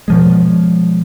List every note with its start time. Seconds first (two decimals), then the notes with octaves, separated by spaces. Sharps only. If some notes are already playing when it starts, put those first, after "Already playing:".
0.08 B2 F3 G#3